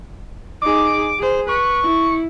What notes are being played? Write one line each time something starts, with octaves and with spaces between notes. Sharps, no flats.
D#4 G#4 D6
G#4 C5
B4 C#6
E4